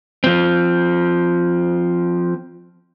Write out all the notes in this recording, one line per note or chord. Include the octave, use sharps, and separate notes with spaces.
F3 C4